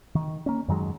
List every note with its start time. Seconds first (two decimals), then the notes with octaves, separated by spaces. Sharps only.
0.15 D#3
0.46 A#3 C#4
0.68 F#2 D#3 F#3 G#3